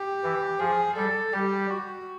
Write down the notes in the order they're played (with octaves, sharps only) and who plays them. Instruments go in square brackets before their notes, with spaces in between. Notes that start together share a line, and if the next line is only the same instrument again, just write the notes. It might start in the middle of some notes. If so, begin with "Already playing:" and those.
Already playing: [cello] G4
[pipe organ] E3
[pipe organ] F3 [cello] G#4
[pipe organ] G3 [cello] A4
[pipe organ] G3 [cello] G4
[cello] F#4